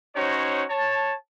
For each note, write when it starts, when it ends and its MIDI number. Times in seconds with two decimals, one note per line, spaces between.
0.16 0.64 61
0.16 0.64 63
0.16 0.64 66
0.16 0.64 72
0.16 0.64 73
0.70 1.15 73
0.70 1.15 81